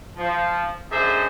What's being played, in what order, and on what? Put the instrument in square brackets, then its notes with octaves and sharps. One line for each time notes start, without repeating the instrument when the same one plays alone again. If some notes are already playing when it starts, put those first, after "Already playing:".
[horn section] F3
F#2 D3 G#4 C5 D#5 E5